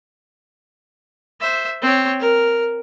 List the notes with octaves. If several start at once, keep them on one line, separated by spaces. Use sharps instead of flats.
C5 E5
C4 C#5
A#4